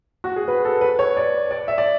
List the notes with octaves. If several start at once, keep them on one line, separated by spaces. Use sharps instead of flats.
F#4
G#4
B4
A4
B4
C#5
D5
D5
E5
D5